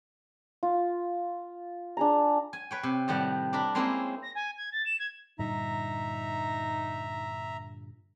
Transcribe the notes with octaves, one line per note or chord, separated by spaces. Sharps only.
F4
D4 G#4 A#5
G#5
B4 C#5 G5
C3
A2 D#3 G3 F#5
D4 A#4 B5
G#3 A#3 C4 C#4 D#4 E4
A#6
G#5
G#6
A6
E7
G#6
G2 A#2 D3 D#4 E5 A#5